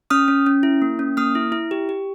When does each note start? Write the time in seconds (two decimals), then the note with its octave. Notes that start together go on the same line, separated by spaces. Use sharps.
0.10 C#4 D#6 F6
0.28 C#4
0.46 C#4
0.63 E4
0.82 A#3
0.99 C#4
1.17 A#3 D#6 F6
1.35 E4
1.52 E4
1.71 G4
1.89 G4